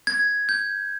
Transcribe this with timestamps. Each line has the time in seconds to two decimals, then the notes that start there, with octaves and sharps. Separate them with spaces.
0.07 G#6
0.49 G6